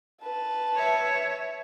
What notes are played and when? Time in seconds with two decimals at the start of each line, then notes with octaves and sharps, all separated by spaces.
0.23 B4 A5
0.76 C#5 E5